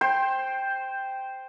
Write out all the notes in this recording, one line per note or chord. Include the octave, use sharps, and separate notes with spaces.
C5 G5 C6